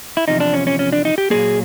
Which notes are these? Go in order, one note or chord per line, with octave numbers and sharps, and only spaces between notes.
E4
E2 C3 F3 D#4
D4
C#4
C#4
C#4
D4
D#4
G4
A#2 F#3 A#3 G#4